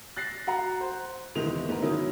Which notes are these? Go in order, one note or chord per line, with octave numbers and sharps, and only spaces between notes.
F#6 A6 A#6 C7
F#4 F#5 A#5
C5
E2 C3 D#3 E3 G#3 F7
G#2 B3 A#4
D#3 F#3 C#4 D#4 E4